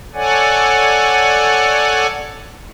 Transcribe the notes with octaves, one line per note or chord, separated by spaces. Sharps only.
A4 C#5 D5 F#5 G#5